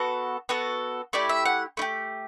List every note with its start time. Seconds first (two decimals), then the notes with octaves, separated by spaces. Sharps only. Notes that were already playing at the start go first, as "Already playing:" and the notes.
Already playing: B3 F#4 A4
0.49 B3 F#4 A4
1.13 A3 E4 G4 D5
1.29 E5
1.45 F#5
1.77 A3 E4
1.82 G4